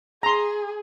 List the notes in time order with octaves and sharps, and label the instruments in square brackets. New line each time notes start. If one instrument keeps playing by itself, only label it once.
[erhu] G#4 [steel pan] A#5 C6